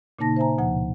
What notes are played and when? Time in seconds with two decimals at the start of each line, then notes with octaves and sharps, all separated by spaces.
0.19 A#2 C#3 A#3 D#4 A5 A#6
0.36 C5 E5 G#5 A#5
0.58 D2 B2 F3 F#5